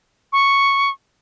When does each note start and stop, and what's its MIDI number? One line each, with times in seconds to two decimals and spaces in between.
0.32 0.90 85